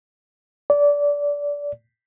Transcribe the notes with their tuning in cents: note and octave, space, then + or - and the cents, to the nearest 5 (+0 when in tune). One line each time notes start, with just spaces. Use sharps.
D5 -20